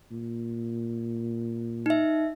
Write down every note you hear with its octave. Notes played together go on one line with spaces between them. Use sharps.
A#2
D#4 E5